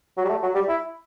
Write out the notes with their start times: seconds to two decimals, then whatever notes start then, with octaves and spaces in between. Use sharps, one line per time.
0.17 F#3
0.25 G3
0.29 A3
0.43 F#3
0.55 G3
0.68 E4